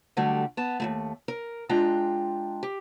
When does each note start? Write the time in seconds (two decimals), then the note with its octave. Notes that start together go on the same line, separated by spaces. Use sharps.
0.17 D3 F#3 G3 A3 G4
0.57 B3 A5
0.80 D#2 E3 A3
1.28 A#4
1.69 G#3 D4 F4 G5 A#5
2.63 G4